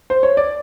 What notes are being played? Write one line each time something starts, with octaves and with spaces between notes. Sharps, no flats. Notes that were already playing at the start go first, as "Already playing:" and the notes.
C5
C#5
D5